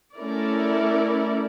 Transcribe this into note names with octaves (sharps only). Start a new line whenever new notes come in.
A3 C#4 E4 A#4 D5